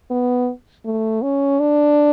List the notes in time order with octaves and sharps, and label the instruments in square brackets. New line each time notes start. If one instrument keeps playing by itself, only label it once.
[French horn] B3
A3
C#4
D4